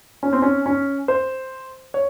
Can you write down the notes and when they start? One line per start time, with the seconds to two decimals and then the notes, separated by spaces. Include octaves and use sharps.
0.23 C#4
0.33 C4
0.42 C#4
0.66 C#4
1.08 C5
1.94 C#5